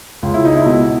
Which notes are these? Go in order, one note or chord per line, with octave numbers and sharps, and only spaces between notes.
C#2 F4
E4
D#4
E4
B2